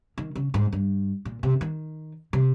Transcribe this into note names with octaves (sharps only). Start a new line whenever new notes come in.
D#3
C#3
G#2
G2
A#2
C3
D#3
C3